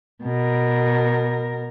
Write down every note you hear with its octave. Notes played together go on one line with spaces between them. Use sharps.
B2 A#4